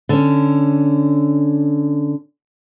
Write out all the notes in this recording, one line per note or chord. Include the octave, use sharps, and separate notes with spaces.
D3 C#4